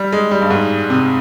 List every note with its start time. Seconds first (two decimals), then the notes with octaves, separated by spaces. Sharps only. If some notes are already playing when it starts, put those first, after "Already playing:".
Already playing: G3
0.12 G#3
0.31 G3
0.42 G2
0.51 G#2
0.90 C3